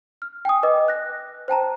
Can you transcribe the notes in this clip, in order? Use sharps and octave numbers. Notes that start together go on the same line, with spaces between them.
F6
G5 G#5 D#6
B4 D#5 D6
F#6 A#6
C5 G5 A5 A#5